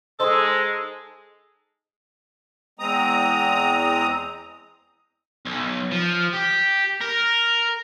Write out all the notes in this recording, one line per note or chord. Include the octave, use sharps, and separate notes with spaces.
G#3 D#4 G#4 A4 C5 C6
E2 G#3 C4 A#5 D#6
B1
F3
G4
A#4